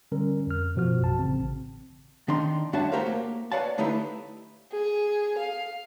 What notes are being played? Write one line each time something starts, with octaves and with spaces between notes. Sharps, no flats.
D3 G3 C#4 A#4
F2 F6
F#2 B2 F3 F#4 F6
A1 A5
A1 C#3 C4
D#3 D4 D#4 C6
G2 D4 F#4 C#5 E5 A5
A3 F#4 G4 A#4 C5 F5
A#3
B4 C#5 D5 F5 F#5 A5
D3 A3 D#4 E4 G4 B4
G#4
F5